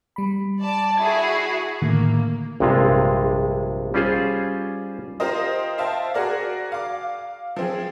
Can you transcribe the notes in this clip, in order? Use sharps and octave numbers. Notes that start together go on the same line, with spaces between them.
G3 B5
D5 A5
E4 F#4 G#4 G#6
A2 D3 D#3 A#3
A#1 G2 C3 G#3 F4
G3 C#4 F4 G#4 C5
F4 G4 A#4 C5 D#5
C5 E5 F5 G5 A5
F#4 G#4 A#4 D5
F5 D6
F3 C4 G#4